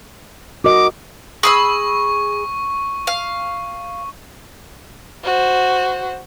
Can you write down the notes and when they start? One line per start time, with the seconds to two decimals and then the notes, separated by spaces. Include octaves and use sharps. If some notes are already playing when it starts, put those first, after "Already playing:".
0.64 F#4 A#4 D#5 D6
1.43 G#4 B5 C#6 E6
3.07 F5
5.25 F#4 C5